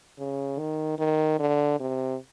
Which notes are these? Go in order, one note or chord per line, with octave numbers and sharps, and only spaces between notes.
C#3
D#3
D#3
D3
C3